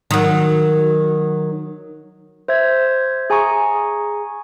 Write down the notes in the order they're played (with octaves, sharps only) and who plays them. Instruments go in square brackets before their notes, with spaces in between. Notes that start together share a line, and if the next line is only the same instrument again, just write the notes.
[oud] D#3 F#3
[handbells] C5 E5 G#6
G#4 G#5 A#5 C#6 D#6